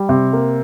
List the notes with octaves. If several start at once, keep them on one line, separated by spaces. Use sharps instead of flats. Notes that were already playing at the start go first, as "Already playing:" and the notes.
Already playing: G3
C3
A#3